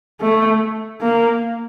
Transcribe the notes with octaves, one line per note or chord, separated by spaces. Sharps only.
A3
A#3